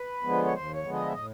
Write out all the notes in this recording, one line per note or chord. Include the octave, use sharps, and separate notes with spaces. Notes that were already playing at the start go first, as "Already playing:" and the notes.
Already playing: B4
D3 F3 G#3 B3
C#5
D#2 C5
C#5
D3 F3 G#3 B3
D#5
E5
A2 D#5